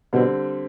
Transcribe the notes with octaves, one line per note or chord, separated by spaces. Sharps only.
B2 D3 G3 C4